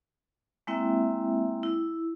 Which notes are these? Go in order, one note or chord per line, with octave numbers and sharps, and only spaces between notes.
G#3 A#3 C4 E4 E5 G5
E4